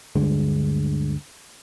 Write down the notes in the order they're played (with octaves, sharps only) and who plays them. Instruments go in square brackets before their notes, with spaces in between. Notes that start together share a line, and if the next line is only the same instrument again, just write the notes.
[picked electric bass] D2 G2 D3 G#3